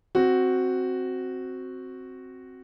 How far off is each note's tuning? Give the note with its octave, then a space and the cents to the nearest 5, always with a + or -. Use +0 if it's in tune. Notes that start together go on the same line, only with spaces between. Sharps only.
C4 +0 F#4 +0